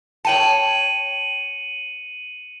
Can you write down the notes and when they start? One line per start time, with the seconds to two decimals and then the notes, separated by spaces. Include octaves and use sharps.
0.25 C#5 G5 A5 C#7 D#7 F#7